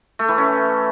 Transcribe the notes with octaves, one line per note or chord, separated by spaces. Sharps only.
A3
E3
C#4